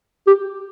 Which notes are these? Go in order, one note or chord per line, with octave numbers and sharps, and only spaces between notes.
G4